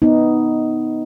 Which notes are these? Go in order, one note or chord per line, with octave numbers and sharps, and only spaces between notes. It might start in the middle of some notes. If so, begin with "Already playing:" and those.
B3 D#4